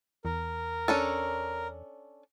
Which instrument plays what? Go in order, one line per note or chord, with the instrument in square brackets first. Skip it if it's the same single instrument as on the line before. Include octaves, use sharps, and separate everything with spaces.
[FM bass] E2 [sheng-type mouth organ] A#4
[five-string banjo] C#4 D4 A4